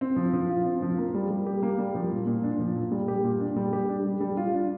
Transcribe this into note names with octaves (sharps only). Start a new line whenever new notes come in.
C4
F3
F3
F4
C4
F3
A#3
G3
G3
G4
A#3
G3
F3
A#2
A#2
D4
F3
A#2
G3
G4
A#2
D4
G3
G4
D4
G3
G3
F4
D4